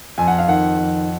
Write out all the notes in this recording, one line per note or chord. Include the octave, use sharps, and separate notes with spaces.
F2 G#5
F#5
F5
D#3 F#5
F2